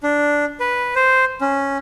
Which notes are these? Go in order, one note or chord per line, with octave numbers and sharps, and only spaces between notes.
D4
B4
C5
C#4